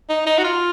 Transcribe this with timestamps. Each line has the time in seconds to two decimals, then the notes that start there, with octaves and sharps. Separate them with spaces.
0.09 D#4
0.26 D#4
0.38 F#4
0.44 F4